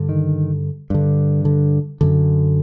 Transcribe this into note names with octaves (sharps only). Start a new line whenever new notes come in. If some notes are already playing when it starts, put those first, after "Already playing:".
Already playing: G2 D3
D#3
G2 D3
D3
F#2 D3